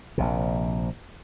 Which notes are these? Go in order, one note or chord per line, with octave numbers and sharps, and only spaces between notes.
A#1 C3